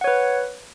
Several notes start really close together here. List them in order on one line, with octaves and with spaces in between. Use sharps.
F#5 C#5 B4